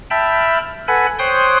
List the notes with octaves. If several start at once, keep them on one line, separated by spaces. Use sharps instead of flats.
E5 G5 A5 B5 F6
A4 B4 F#5 G#5 B5
C5 C#5 G5 C6 D#6 F#6